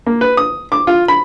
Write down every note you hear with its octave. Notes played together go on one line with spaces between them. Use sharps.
A#3
B4
D#6
D6
F4
B5